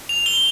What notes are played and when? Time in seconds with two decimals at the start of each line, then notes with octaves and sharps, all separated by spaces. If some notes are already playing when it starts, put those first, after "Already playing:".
0.09 F7
0.26 G7